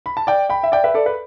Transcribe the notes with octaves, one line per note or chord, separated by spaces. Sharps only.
B5
A5
D5 G5
G5 B5
E5
D5 G5
B4 E5
A4 D5
B4